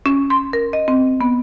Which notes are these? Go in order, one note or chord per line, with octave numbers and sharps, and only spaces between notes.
C#4
C6
A#4
D#5
C4
B3